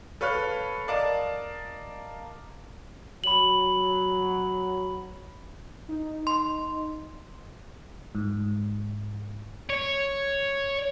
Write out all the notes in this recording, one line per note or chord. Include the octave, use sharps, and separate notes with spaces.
A4 B4 C#5 F5 F6 F#6
A#4 D5 D#5 F5 A5
F#3 B5 F#7
D#4
C6
G#2
C#5